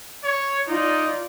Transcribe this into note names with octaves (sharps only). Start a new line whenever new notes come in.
C#5
D#4 F4 D5